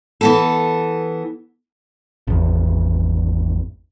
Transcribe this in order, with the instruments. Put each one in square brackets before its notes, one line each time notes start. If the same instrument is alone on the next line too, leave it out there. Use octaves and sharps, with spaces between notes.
[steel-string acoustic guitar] E3 B3 A4
[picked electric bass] G#1 E2